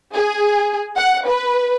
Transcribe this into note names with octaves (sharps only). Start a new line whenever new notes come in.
G#4
F#5
B4